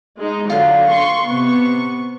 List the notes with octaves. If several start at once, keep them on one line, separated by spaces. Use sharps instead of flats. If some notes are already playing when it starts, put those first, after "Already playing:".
G#3 D#4
D3 F#3 F4 F5
C6 C#6
C3 B3 C#6